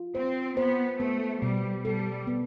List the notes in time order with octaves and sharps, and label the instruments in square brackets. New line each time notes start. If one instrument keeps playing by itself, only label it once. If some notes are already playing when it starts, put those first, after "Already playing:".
Already playing: [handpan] F4
[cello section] C4 [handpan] C5
[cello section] B3 [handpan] C5
[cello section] A3 [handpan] B3
[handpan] B2 [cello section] G3
[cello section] G3 [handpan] A4
[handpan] B3